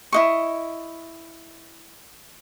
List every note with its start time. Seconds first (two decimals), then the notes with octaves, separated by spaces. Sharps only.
0.13 E4 D#5 C#6